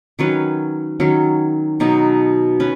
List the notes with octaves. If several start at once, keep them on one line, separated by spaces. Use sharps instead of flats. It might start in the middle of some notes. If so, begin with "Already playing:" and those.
D#3 F#3 C#4 B4
D#3 F#3 C#4
B2 F#3 D#4
C#4 B4